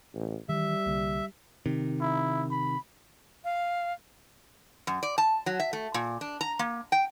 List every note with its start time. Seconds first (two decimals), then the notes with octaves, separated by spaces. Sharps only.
0.15 A1
0.49 D#3 E3 G3 E5
0.86 C2 D3 A#3
1.66 C3 D#3
2.01 E4
2.50 B5
3.44 F5
4.87 F#2
5.03 D5
5.18 A5
5.46 F#3
5.60 E5
5.73 A3
5.94 A#2
6.21 D4
6.41 A#5
6.59 A#3
6.92 G5